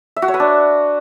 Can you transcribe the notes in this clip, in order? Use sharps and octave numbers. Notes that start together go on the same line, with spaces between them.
E5
F#4
C#5
B4
D4